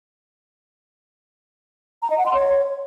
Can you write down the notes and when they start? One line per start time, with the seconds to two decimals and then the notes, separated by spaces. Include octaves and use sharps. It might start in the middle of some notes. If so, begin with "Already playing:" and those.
2.02 A#5
2.10 D#5
2.18 F#5
2.26 C6
2.34 C#5